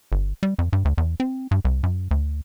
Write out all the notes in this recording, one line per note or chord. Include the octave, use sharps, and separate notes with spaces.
G1
G3
F2
G2
D2
E2
C4
G2
C2
F#2
D2